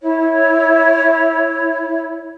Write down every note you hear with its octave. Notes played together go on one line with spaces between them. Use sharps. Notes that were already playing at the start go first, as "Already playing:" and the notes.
E4 C#5